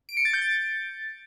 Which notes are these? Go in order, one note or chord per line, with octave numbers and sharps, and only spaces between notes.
D7
C#7
A6
G6
A6